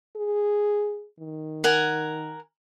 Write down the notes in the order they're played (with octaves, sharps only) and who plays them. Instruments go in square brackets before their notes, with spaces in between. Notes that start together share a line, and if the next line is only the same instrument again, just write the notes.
[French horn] G#4
D#3
[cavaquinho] A#4 F#5 G#5